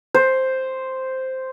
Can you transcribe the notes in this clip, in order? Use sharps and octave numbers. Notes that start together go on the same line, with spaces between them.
C5